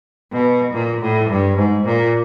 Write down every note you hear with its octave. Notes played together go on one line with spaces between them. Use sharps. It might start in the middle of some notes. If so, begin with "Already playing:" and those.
B2
A#2
A2
G2
G#2
A#2